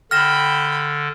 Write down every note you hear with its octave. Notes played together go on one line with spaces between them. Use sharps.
D3 G5 B5 F6 A#6 E7